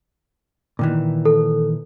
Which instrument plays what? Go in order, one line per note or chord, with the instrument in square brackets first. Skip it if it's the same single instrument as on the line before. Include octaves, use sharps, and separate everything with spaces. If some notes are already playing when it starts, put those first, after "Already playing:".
[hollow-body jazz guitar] A#2 D#3 E3
[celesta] A4